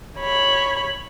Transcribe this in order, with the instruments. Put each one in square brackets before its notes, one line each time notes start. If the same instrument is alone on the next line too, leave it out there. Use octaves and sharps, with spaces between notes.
[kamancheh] C#5 B5